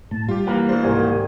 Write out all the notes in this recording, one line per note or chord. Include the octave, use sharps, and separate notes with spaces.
A2 A5
G3 F4 G4
E3 A#3 F#4 B4
B2 D4 A4 C5
C2 G#2 D#3 G4 G#5